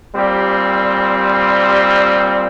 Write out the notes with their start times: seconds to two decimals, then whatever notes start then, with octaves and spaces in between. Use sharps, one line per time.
0.15 A#2 G3 C4 G4
1.65 G4